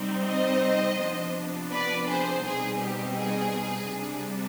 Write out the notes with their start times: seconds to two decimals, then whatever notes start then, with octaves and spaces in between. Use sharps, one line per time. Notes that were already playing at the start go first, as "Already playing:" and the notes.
Already playing: C3 G3 C4 D#4
0.27 C5 D#5
0.99 C3 F3 B3 D4
1.71 B4 D5
2.08 G#4 C5
2.44 B2 G3 C4 D#4 G#4
2.80 G4
3.16 G#4
3.88 C3 G3 D4